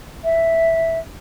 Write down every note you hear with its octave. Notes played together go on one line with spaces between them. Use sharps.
E5